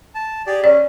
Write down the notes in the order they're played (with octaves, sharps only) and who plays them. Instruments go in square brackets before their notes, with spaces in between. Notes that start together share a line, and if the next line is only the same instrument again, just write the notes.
[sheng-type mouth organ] A5
G4 G#4 D5
[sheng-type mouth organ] C#4 [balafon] D5